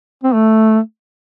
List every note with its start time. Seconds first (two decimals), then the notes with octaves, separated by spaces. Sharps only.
0.23 C4
0.34 A3